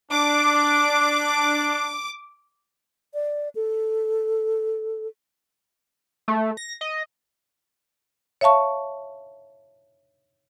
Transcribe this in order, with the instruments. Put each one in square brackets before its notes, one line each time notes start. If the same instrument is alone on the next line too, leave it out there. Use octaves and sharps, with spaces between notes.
[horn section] D4 [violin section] D6
[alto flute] D5
A4
[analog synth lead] A3
A#6
D#5
[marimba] C#5 E5 F5 A5 C#6